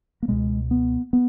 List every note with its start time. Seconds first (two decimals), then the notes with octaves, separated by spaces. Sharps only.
0.23 A#3
0.28 C#2 B2 G#3
0.71 B3
1.13 B3